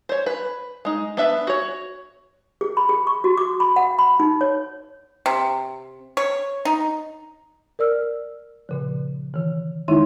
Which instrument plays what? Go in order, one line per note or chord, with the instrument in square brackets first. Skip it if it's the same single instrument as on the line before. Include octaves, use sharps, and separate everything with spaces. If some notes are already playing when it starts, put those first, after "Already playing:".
[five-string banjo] C5 C#5
B4
G#3 D#4
B3 D4 B4 E5
F#4 C#5
[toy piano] G#4
B5
G#4
C#6
F#4
D6
B5
F#5
B5
D#4
C#5
[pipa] C3
C#5
D#4
[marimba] A#4 D5 E6 F6
A#2 C#3 F3
D#3 E3
D#3 G#3 D#4 E4 E5 C6